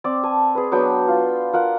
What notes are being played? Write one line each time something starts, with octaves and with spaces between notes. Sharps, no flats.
C4 D5
G#5 A5
G#4 B4
F#3 B3 D4 G5
F4
F4 A#4 F#5